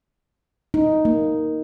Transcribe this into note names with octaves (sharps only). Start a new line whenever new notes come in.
D#4
A#3